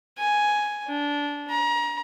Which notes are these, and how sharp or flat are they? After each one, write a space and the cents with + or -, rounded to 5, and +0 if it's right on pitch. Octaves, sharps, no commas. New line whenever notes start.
G#5 +5
D4 -20
A#5 +30